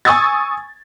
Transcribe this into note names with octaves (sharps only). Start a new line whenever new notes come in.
G#5 C#6 D#6 E6 G#6 A6